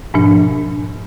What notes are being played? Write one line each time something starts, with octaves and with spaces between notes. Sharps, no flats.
G#2 B2 F3 D4